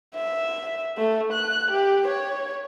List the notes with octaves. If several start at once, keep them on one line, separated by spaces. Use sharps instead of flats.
E5
A3
F#6
G4
C#5